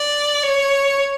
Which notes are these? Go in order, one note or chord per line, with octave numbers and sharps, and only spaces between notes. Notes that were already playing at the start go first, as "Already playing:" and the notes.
Already playing: D5
C#5